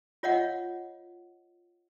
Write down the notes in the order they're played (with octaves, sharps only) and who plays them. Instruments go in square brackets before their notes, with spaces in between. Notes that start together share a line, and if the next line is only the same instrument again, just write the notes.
[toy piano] F4 C#5 D#5 F5 F#5